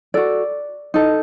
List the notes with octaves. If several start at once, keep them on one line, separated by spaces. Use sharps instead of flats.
F#4 A4 D5
D#4 A4